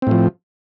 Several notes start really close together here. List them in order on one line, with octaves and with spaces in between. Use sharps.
C4 A2 F3